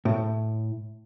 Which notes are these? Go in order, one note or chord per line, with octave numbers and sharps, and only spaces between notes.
A2